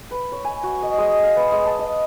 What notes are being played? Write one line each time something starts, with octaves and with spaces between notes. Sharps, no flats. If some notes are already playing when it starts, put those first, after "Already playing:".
B4
C#5
G#5
F#4
D#5
G#3
F5
B4
G#3
A5
D#5